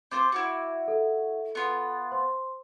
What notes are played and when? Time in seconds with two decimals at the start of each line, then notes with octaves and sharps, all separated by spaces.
0.11 C4 F4 C5 D6 G6
0.32 E4 F#4
0.88 A4
1.55 B3 F4
2.12 C5 C6